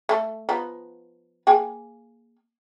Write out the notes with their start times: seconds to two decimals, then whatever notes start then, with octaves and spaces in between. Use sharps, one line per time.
0.09 A3 A4
0.49 F3 B3 D#4
1.47 A#3 G#4 G5